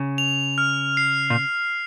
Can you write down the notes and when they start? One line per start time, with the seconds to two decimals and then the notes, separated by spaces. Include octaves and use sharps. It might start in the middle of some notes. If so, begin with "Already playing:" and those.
Already playing: C#3
0.18 F7
0.58 F6
0.97 C7
1.30 A#2